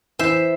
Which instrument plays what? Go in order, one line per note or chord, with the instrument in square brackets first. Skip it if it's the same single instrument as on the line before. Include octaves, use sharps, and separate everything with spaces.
[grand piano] E3 [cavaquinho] C5 E5